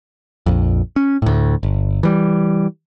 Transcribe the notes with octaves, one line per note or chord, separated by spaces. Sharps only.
A#1 F2
C#4
D2 A2
G1
E3 G3